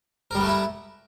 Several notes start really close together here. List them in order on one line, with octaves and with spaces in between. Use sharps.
A#4 G3 B3 A3 E4